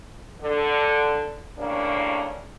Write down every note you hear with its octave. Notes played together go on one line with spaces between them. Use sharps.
D3
D#2 A2 C#3 A#3 D4